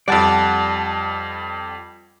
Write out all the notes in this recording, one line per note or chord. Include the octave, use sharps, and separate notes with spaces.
F2 G3 D5 F#5 A5